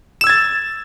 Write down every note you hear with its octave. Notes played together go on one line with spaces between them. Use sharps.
E6 G#6 A6 E7